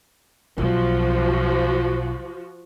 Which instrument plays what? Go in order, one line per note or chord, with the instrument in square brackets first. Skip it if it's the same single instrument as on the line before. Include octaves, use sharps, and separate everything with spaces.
[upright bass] B1 B2 [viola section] F3 F#4